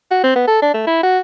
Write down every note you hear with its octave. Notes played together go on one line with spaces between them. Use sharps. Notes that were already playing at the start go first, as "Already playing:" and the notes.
F#4
C4
B3
A4
D4
A3
E4
F#4